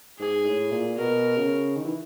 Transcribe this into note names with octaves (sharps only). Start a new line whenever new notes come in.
G#2 G#4
A2
A#2
B2 A#4
C#3
D#3
E3